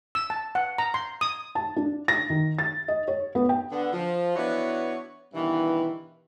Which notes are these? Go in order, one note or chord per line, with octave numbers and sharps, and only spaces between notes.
E6
A5
F#5
A#5
C6
D#6
A5
D4
A#6
D#3
A6
D#5
C#5
B3
G5
D3 B3
F3
E3 B3 D4 F#4 B4 C#5
G2 B2 D#3 E3